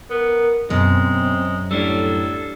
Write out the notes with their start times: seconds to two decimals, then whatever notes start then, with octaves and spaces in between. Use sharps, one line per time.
0.10 B3 A#4
0.70 F#2 B2 G#3 C4
1.71 A2 G3 D4 A4 C#5